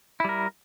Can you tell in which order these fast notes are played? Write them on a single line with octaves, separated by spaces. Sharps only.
E4 G3 A#4